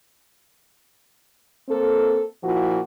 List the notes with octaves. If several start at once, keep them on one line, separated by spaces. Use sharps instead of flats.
A#3 C4 A4
A#2 F3 E4 F#4